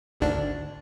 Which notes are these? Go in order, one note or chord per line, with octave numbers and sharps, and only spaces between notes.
G#1 D2 D4